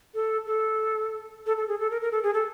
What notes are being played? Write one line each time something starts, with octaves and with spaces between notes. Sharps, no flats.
A4
A4
A4
A4
G#4
A4
A#4
A#4
A4
G#4
A4